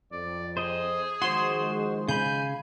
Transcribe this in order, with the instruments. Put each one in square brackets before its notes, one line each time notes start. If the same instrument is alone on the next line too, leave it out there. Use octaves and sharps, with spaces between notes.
[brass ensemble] F2 [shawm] D5
[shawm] G#4 [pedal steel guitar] C5 D#5
[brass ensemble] D#3 F3 G#3 [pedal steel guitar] F#4 C5 [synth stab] C6
[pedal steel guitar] C#3 B5 [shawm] G#5 [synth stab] G6